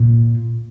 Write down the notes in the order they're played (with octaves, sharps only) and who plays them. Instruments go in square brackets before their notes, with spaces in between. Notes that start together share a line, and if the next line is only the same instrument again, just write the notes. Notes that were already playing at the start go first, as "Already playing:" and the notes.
Already playing: [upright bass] A#2